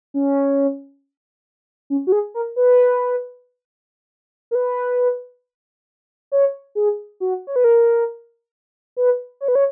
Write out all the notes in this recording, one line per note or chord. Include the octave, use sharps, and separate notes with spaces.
C#4
C#4
F#4
G#4
A#4
B4
A#4
B4
C#5
G#4
F#4
C#5
B4
A#4
B4
C#5
B4
C#5